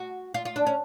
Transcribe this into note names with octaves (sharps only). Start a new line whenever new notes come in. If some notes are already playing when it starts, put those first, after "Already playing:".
Already playing: F#4
F4
F4
D4
C#4